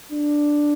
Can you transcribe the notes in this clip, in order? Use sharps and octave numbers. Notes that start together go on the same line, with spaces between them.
D4